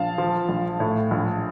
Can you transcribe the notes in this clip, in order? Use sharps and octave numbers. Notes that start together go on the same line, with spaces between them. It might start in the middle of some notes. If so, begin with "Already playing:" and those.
Already playing: A#1 F5 A5
F3
A#1
A2
A#1